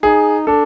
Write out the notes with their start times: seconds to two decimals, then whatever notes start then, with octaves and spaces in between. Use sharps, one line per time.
0.03 D#4 G#4
0.47 D4 A4